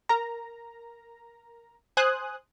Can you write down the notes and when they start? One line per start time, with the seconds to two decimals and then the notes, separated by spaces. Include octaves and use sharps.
0.09 A#4 A#5
1.97 C5 G#5 D#6 F#6